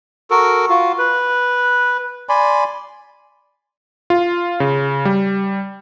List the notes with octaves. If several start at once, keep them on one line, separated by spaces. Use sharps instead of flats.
F#4 A4 A#4
F4 F#4
B4
D5 G#5 B5 C6
F4
C#3
G3